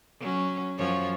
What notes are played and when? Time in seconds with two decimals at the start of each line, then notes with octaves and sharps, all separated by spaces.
0.20 F#3 C#4
0.78 F#2 F3 C#5